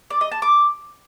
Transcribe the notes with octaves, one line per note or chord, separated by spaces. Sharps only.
D5
D#5
A5
D6